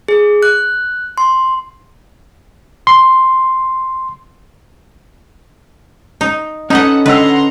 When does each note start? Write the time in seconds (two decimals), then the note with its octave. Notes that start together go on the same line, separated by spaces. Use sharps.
0.08 G#4
0.43 F#6
1.18 C6
2.87 C6
6.21 D#4
6.70 C#4 D#4 A4 B4 D#5 F#5
7.06 D3 B4 D#5 F#5 A#5 C6 E6